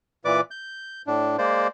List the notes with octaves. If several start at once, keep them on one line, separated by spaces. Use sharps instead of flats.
A#2 E3 B4 D5 D6
G6
A2 D4
G#3 A#3 C5 D5